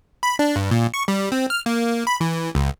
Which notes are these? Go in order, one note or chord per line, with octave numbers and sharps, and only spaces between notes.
B5
D4
G2
A#2
C#6
G3
C4
F6
A#3
B5
E3
C#2